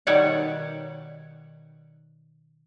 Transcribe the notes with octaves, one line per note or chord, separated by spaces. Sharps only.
B2 D#3 G3 C#5 D5 F#5